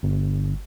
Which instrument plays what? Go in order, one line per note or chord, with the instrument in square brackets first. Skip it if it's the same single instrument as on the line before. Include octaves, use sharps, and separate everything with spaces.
[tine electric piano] G1